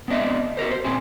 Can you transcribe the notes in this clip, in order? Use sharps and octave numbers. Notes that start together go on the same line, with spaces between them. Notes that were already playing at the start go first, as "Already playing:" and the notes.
B3 C4 D4 D#5 E5
F#4 G4 A#4 C5
C5
A#2 C4 C#4 G#4 C5